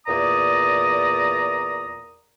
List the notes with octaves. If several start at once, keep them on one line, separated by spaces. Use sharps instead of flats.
E2 A#2 D5 A#5 D#6